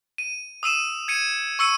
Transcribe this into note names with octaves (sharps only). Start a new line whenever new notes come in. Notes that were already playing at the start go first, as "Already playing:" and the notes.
D#7
D#6 E6 D#7 E7
G#6 C#7 D#7
C#6 E6 C#7 D#7